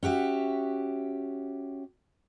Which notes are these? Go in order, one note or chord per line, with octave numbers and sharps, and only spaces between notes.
C#4 F#4 G4 E5